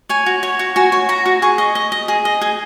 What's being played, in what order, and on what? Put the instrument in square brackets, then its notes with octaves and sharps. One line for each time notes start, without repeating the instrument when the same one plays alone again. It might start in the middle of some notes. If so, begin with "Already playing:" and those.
[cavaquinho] C#5 G#5
F#4
C#5
F#4
F#4 G#5
C#5
F#4 A#5
F#4
G#4 C#6
D#5
D#5
D#5
G#4
D#5
G#4